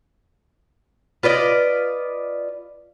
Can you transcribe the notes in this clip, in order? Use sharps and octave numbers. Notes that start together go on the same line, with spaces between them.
F4 B4 D5 D#5